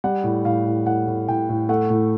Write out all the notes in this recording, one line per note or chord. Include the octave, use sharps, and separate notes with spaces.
G3 F#5
A2
A2 F5
A2
A2 F#5
A2
A2 G5
A2
A3 F#5
A2